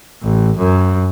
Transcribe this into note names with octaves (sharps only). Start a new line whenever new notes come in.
A1
F#2